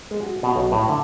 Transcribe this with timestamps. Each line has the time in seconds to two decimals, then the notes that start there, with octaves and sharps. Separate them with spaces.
0.11 G#3
0.23 F#4
0.43 B2
0.56 B1
0.72 A2
0.89 D3